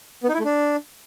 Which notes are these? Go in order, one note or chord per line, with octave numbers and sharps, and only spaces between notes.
B3
D#4
E4
A3
D4